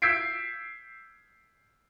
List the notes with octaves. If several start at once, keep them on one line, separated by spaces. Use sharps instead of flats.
E6 G6 G#6 B6 C7 D7